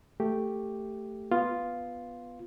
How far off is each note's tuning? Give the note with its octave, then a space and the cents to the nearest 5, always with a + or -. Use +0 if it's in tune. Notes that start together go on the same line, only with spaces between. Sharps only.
A3 +10 G4 +0
B3 +0 F4 +0